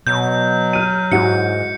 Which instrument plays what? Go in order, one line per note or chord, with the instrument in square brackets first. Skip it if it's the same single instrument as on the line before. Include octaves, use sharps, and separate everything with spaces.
[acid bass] B2 [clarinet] F#3 [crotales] G6
[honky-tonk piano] F6 D#7
[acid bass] G#2 [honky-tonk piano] E4 F#4 [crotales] C#7